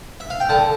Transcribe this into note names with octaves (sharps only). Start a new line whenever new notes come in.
E5
F5
G5
D3 A5